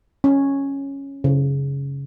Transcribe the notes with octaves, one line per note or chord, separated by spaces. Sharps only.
C#4
C#3